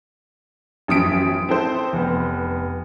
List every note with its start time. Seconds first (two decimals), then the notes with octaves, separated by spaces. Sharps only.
0.88 A1 F#2 F3 D#6 B6 D7
1.49 C4 E4 A4 C5
1.93 F1 B3